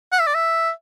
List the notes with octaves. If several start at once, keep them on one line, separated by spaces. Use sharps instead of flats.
F#5
E5
D5
E5